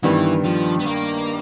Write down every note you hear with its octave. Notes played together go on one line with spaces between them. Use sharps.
G2 D#3 E3 G3 B3
F3
B3
A#3